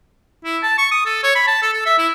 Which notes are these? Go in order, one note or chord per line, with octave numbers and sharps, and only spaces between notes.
E4
A5
C#6
D#6
A4
C#5
B5
A5
A4
A4
E5
E4